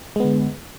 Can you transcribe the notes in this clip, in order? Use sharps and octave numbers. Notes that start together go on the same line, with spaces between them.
D3 G#3 B3